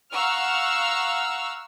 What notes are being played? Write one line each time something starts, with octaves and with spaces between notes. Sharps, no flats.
F5 F#5 A#5 C#6 E6 F6